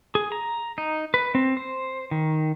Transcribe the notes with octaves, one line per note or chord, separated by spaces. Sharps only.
G#4
A#5
D#4
B4
C4
C5
D#3